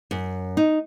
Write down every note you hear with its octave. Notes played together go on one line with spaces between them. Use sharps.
F#2
D#4